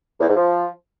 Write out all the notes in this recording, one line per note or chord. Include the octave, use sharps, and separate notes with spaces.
E2
G#2
F3